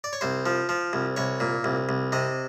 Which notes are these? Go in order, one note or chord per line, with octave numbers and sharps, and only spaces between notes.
D5
C#5
C2 C5
F3
F3
C2
C2 C#5
A#2
C2
C2
C3 D#5